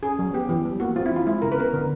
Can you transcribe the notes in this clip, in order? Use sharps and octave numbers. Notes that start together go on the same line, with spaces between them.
C#4 G#4
F#3
B3 G4
E3 G4
G3
A#3 F#4
C4 F4
E4
E3 F4
G#3 E4
C#3 A#4
B4
B3 A#4
D3